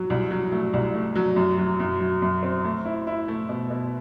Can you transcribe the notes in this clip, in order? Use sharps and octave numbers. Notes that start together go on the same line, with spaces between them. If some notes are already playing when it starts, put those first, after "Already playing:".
Already playing: F#3
C2
F#3
A3
C2
A3
F#3
F#2
F#3
F#2
F#3
F#2
C4
A3
E4
E4
A3
B2
B2